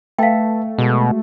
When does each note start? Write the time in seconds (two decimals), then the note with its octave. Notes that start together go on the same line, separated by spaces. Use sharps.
0.19 A3 B4 E5 F5 G5 A5
0.78 B2 G#3 F#4